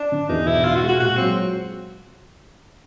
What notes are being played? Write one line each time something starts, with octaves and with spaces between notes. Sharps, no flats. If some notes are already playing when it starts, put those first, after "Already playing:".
Already playing: D4
D3
E2 D#4
B2 E4
B2 F4
F#4
G#3
F#4
A#2 F#4
F#3 C4